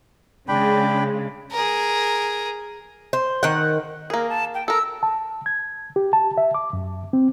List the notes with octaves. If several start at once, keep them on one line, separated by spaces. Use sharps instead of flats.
C#3 G#3 D4 G5 B5
G#4 A#4
C5
D#3 F#5
A#3 G#4 A#4
A5
G5
A4 A#4 E6
A5
G#6
G4
A5
E5
D6
F#2
C4